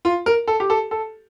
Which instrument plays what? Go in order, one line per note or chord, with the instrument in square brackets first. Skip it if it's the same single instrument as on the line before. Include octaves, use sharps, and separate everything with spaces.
[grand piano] F4
A#4
A4
G4
A4
A4